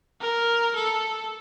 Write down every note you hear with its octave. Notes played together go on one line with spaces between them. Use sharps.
A#4
A4